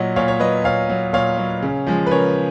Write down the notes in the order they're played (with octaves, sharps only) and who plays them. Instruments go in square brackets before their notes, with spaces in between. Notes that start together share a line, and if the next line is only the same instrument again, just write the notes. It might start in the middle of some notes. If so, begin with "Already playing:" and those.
Already playing: [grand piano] A#2 F#3 D#5 F#5
A#2 C#5 F5
C#5
F#3 B4 D#5
A#2 C#5 F5
F#3
A#2 C#5 F5
F#3
C#3
F3 G#3
B4
C#3 A#4 C#5